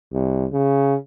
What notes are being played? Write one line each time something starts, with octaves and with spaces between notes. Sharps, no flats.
C2
C#3